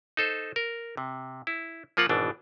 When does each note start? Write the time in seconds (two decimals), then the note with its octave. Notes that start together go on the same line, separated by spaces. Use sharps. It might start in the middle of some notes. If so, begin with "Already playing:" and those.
0.17 D#4 A4 C5
0.56 A#4
0.97 C3
1.47 E4
1.97 F3 A#3 F4 F#5
2.09 G#1 B2 E3 D4